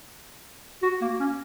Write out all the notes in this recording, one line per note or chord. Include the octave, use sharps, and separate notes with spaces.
F#4
A#3
C#4